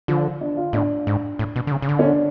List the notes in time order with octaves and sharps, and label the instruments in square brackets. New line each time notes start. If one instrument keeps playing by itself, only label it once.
[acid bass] D3 [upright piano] F3
[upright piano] D4
F4
[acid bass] A2 [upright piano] D4
[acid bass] G#2
A2
B2
D3
C#3
C#3
D3
[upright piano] C#4
D4